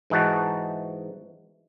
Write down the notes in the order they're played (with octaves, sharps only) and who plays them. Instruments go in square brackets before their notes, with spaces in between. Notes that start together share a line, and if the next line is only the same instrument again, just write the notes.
[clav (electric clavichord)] G#2 E3 D#4 F#4 A5